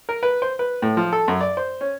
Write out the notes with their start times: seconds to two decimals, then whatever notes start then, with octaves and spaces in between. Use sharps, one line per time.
0.09 A#4
0.23 B4
0.42 C5
0.59 B4
0.82 A2
0.97 F3
1.13 A4
1.28 F#2
1.41 D5
1.57 C5
1.81 C#4